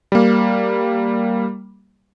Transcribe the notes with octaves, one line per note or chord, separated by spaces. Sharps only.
G3 A#3